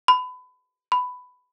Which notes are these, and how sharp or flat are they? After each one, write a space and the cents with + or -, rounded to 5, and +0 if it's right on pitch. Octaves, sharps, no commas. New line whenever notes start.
B5 +30
B5 +15